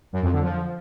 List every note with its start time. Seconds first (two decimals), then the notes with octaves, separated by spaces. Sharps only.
0.13 F#2
0.22 F2
0.32 D3
0.42 F3